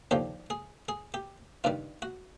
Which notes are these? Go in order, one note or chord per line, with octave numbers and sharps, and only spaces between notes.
D#2 D3 F3 G4
G#4
G#4
G4
G2 D#3 G3 F4
F#4